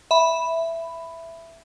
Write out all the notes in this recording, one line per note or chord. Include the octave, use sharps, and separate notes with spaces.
E5 B5